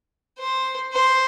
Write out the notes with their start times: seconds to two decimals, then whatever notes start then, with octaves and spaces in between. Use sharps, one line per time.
0.38 C5
0.93 C5